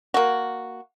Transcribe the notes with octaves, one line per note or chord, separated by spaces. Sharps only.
A#3 F#4